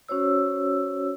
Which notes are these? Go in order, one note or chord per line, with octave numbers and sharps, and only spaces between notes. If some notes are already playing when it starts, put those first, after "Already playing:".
C#4 F#4 C5 C#5 E6